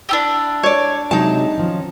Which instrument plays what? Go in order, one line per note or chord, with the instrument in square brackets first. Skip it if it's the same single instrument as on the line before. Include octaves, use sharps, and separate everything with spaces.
[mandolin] D4 E4 G4
[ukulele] C#5 D5
[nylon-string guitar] C3 F#3 G#3 [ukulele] D#4 A5
[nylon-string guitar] D#3 F3 C#4